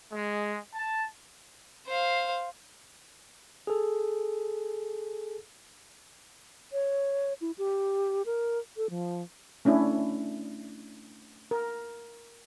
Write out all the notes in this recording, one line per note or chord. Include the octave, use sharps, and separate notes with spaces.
G#3
A5
C5 F5
G#4 A4
C#5
E4
G4
A#4
A4
F3
A3 C#4 D4 E4
A#4